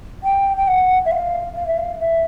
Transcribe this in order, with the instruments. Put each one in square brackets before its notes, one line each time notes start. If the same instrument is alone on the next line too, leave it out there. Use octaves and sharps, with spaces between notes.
[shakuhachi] G5
G5
F#5
E5
F5
F5
E5
F5
E5